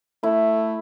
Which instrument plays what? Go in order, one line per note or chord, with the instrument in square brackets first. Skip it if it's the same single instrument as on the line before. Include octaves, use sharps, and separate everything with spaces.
[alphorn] A3 [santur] E4